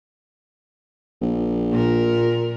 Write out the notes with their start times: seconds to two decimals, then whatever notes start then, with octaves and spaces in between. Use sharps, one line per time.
1.21 A#1
1.71 A#2 A#4